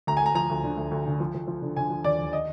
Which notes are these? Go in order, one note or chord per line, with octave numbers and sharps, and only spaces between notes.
D2 A#5
G#5
D2 A#5
F3 A#5
D2
D3
D2
D2
D3
F3
F3
F3
D3
D3 G#5
F3
D#2 D5
D#2
D#5